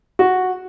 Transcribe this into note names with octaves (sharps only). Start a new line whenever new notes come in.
F#4